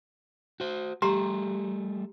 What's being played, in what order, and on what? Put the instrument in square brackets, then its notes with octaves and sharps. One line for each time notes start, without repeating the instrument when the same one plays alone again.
[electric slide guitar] F#4 C5
[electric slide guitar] G3 A3 [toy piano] G4 A#5 C6